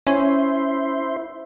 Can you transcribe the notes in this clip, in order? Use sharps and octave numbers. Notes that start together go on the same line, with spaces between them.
C#4 E4 C5